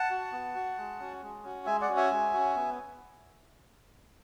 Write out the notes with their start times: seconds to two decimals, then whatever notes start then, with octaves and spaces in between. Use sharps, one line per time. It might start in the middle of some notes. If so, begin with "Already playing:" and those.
Already playing: F#5 A5
0.10 F#4
0.32 B3
0.55 F#4
0.78 G#3
1.00 C#4 F#4
1.22 G#3
1.44 C#4 F#4
1.66 G#3 E5 G#5
1.81 D5 F#5
1.89 C#4 F#4
1.97 E5 G#5
2.11 G#3
2.33 C#4 F#4
2.56 B3